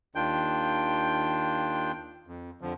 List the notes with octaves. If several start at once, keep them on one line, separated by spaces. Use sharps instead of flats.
D#2 D#3 D4 F4 G5 G6
F2
F2 D3 F3